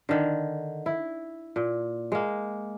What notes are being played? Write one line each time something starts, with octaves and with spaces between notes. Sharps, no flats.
D3 D#3
E4
A#2
G#3 A#3